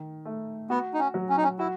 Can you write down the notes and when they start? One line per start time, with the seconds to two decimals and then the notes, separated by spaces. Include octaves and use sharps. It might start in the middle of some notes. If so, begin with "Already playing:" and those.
Already playing: D#3
0.25 A3
0.70 B3 F#4
0.94 D#4
0.99 C#4
1.14 F#3
1.29 C#4
1.37 D#4
1.43 C#4
1.59 E4 F#4